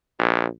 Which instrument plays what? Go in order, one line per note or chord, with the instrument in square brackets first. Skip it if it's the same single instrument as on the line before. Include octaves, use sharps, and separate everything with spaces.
[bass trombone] A#1